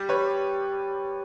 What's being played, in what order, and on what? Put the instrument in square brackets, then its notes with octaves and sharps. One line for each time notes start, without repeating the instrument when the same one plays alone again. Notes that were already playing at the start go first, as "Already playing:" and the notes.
Already playing: [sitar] G3
[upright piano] B4 C#5